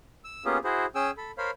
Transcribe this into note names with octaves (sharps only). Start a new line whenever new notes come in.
E6
A#3 B3 C#4 F4 G4 G#4
E4 F#4 G#4 C5
C#4 G#4 G5 G#5 E6
A4 B5
A#4 C5 C#5 F5 B5